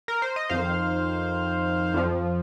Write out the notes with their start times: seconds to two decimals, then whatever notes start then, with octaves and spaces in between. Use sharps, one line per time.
0.08 A#4
0.22 C5
0.36 D#5
0.49 F2 D#3 C5 F5
1.94 F2 F3